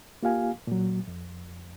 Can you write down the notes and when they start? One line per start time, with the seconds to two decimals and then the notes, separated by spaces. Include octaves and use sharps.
0.23 A#3 F4 G4 F5 G#5
0.67 A#2 F#3
1.08 F2